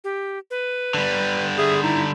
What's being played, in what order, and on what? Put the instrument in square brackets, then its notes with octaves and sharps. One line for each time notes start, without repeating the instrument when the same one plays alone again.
[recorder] G4
B4
[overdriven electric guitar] D3 G3
[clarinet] G#4 [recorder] E5
[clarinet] D#4 [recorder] E4